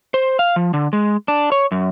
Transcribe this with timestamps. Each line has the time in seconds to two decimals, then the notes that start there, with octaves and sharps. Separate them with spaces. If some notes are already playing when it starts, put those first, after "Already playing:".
0.14 C5
0.39 F5
0.56 F3
0.74 D3
0.93 G#3
1.28 D4
1.52 C#5
1.72 F#2